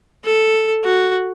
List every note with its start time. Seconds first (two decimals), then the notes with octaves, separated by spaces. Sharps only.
0.24 A4
0.84 F#4